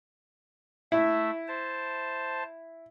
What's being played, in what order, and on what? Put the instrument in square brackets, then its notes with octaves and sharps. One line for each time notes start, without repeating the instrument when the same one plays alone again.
[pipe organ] A3 E5 [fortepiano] E4
[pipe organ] C5 A5